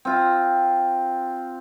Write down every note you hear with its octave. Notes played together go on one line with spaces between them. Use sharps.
C4 F4